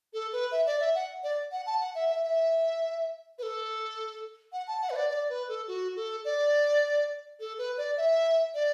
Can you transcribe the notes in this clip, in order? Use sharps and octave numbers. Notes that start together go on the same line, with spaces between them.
A4
B4
E5
D5
E5
F#5
D5
F#5
A5
F#5
E5
E5
E5
B4
A4
F#5
A5
F#5
B4
D5
D5
B4
A4
F#4
A4
D5
A4
B4
D5
E5
D5